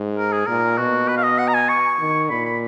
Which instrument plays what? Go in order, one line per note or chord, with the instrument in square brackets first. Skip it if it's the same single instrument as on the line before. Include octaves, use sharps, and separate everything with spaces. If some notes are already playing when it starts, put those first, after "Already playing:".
Already playing: [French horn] G#2
[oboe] A#4
G#4
[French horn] A#2 [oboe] A#4
[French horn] B2 [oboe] F#4
[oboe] B4
F5
D#5
F#5
A#5
G#5
C#6
[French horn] D#3
[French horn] A#2 [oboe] B5
[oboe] B5